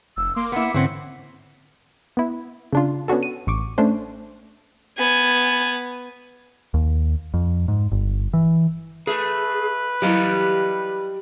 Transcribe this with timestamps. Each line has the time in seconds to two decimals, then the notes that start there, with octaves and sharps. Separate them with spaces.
0.17 F1 E6
0.36 A#3 C6 D6
0.52 B3 E4 F#5
0.75 G#2 D3 E3 C4 C#4 F#5
2.17 B3 E4
2.73 C#3 D4 F4
3.08 B3 C#4 D4 F#4 A4
3.23 D#7
3.47 A1 C#6 D6
3.78 A3 C#4 D4 C5
4.99 B3 G#5
6.74 D#2
7.34 F2
7.68 G#2
7.92 G1
8.33 E3
9.07 A3 G#4 B4
10.02 F#3 G3 E4 G4 D#5 F5